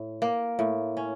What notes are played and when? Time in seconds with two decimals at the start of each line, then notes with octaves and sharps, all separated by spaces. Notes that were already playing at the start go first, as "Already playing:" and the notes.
Already playing: A2
0.22 A#3
0.59 A2
0.97 C#4